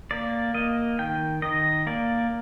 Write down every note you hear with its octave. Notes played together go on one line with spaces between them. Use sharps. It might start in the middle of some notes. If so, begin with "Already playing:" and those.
A#3 D5
A#3 D#5
D#3 G5
D#3 D#5
A#3 D5